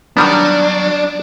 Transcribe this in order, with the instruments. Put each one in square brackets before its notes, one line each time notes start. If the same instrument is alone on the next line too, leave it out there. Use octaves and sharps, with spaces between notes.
[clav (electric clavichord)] D#3 G3 B3 [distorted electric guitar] F#3 [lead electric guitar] D4